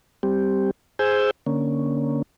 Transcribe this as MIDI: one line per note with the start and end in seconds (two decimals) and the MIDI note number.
0.23 0.71 55
0.23 0.71 60
0.23 0.71 67
0.99 1.31 68
0.99 1.31 72
0.99 1.31 80
0.99 1.31 88
0.99 1.31 91
1.46 2.22 50
1.46 2.22 58
1.46 2.22 61